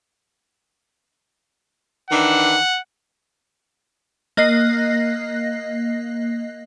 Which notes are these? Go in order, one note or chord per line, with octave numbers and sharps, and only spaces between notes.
D#3 E3 D4 F#5
A#3 D#5 F#6 A#6 C7